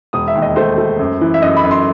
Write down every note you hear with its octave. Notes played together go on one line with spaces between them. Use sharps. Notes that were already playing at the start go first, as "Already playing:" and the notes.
E1 D#6
E5
D#2
D#5
A3 C5
A3
F#2
E3
E5
F#2 D#5
B5
F#2
C6